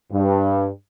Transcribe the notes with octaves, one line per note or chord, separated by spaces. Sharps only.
G2